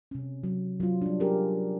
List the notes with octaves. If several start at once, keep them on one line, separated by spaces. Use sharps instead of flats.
C3 C#4
F#3
F#3 F4
G3 D4
C#4 G4 G#4 A#4